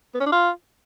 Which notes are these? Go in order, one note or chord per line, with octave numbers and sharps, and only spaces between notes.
B3
C#4
D4
F4